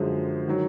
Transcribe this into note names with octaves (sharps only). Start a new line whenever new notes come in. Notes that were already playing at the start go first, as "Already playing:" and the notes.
Already playing: F#2 D3 F3 G#3
D#3 F#3